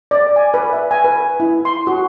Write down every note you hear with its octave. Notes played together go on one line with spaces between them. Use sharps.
D5
G#5
B4
E5
G#5
B4
E4
C6
F#4